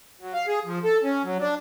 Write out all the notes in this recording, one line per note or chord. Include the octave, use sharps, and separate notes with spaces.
F#3
F5
G#4
F3
A4
C#4
F#3
D4